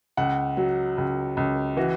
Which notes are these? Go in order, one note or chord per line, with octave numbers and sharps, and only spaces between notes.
C#2 F#5
F#3
C#2
C#2
E3 F#4